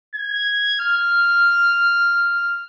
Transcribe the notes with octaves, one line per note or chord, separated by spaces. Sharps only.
G#6
F6